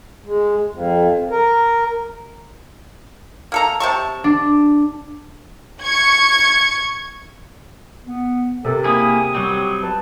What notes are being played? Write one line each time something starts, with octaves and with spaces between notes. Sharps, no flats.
G#3
F2
A#4
A#3 A4 A#5
C3 A5 C#6
D4
C#6 G#6
B3
C3 A4 A#4
A#3 E4 G#4 D#6
F#3 G3 C4
B4 A5